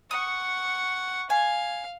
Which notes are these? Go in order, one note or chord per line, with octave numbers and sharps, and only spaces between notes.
F#5 C#6 D#6
F5 G#5